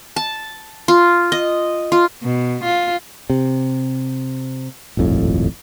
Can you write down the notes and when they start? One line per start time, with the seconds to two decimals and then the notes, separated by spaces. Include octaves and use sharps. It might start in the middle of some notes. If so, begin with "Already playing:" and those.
0.16 A5
0.88 F4
1.32 D#5
1.92 F4
2.23 B2
2.64 F4
3.30 C3
4.97 D#1 G#1 F2 A2